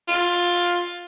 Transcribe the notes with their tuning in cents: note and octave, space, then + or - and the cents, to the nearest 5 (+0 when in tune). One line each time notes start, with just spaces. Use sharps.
F4 +10